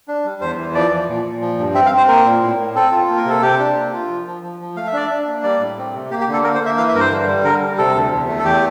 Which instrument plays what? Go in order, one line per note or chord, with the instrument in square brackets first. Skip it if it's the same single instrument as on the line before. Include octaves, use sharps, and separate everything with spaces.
[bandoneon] D4
G3
E2 C5
E3
F3 D5
F3
A#2
A#2
F3
G2
C4 E5
F5
C4
C5
A#3 A#4
A#2
A2
A2
C4 A4
F4
A#3
A#4
C3 A4
C3 G4
D4
A#3
F4
F3
F3
F3
F3
A3 F5
E5
D4 D5
D4 E5
A#3
G3 D5
A2
C4
C3
A#3 G4
G4
D3
A4
A#3 A#4
C5
A#3
E5
E3 F5
E5
G2 A#4
C5
D3
G3
D3 A#4
G3
C3 A4
D2
E2
A3
A4
E2 G4